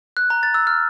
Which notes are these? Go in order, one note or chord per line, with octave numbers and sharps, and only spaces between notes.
F#6
A#5
A6
E6
F6